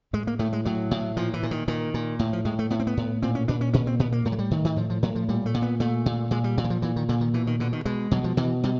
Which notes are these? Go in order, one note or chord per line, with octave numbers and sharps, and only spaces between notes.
A2 G#3
A#3
A2 A3
G#3
A2 F#3
A2
A#2 F3
E3
A#2
D#3
A#2 D#3
A#2
A2
F3
A2 G#3
A3
A2 B3
C4
B3
A2
A#2 C4
C#4
A#2 D4
C#4
A#2 C#4
C4
A#2 B3
A#3
A2 A3
F#3
G3
A2 D#3
D#3
A2 F3
F3
A2 F#3
F3
A#2 G3
A3
A#2
B3
A#2 A3
A#2
A#2 G#3
G3
A#2 F#3
E3
F3
A#2 E3
D#3
A#2 D3
D#3
B2 E3
D#3
B2 D3
D#3
B2 G#3
B2 F#3
F3
B2 E3
B2 G3